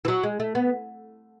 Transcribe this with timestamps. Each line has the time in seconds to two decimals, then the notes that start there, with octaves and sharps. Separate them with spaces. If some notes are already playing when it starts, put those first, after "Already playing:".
0.05 E3
0.08 F#3
0.23 G#3
0.40 A3
0.55 B3